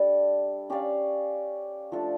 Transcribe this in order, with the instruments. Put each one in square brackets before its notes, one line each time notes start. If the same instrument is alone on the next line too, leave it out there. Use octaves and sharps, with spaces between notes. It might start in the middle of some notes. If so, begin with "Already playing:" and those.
Already playing: [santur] G3 D4 A4 E5
C#4 G4 D5 F5
F3 A3 D4 A4